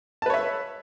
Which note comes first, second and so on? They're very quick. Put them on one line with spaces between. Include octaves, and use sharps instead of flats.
A5 B4 C#5 E5